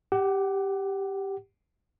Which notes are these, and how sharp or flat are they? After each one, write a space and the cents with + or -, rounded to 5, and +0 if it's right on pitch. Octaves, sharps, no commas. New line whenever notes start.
G4 +0 F#5 +30